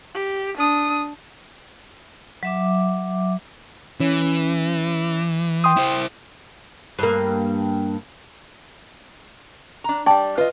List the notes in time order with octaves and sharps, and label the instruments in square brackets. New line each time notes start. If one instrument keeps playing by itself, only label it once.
[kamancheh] G4
D4 D#6
[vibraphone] F#3 E5 D6
[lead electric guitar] E3 [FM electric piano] C#4
[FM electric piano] G5 C6 D#6
[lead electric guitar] E4 C5
[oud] G2 A#3
[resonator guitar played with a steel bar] D4 A#5
[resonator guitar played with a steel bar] G3 D5 [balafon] G5 A5
[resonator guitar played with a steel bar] F4 D#5 [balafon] B4